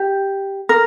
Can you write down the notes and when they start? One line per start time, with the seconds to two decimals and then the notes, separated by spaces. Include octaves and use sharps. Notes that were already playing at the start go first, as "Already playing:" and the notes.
Already playing: G4
0.69 A#4